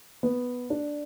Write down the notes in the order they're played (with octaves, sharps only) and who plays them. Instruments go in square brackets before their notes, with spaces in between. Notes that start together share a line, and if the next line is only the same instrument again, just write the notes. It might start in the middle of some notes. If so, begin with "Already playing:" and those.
[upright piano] B3
D4